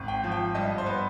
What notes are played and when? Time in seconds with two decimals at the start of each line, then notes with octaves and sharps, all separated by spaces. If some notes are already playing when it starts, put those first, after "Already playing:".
Already playing: G#1
0.08 G5
0.23 F3
0.31 G5
0.55 G2 D#5
0.78 C5
0.86 B3